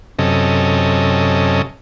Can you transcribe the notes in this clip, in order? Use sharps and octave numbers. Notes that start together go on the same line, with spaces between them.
F#2 C3 C#4 A4 D#5